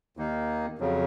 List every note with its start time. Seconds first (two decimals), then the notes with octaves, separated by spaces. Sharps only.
0.17 D#2 D#3 A#3 D#4
0.79 F2 C#3 F#3